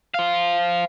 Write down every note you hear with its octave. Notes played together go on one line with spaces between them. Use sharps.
C5 F5